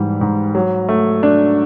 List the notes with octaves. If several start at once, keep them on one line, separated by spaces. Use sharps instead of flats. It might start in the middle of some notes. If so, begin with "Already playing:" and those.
Already playing: G#2 E3 G3
G#2
F#3
A3
D4